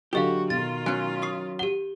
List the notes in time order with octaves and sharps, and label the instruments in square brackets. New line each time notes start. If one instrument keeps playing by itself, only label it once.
[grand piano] D3 F#3 [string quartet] F#4 [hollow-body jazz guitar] G4 [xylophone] A4 D#5 F5
[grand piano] B2 [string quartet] D#3 F4 [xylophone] A6
[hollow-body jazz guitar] F#3 C#4 [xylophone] G#5 F#6
[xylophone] C#6 D#6 C7
[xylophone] G4 F#5 [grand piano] G7